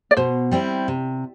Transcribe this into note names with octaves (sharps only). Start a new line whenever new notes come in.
D5
B2 C5
G3 C4 E4
C3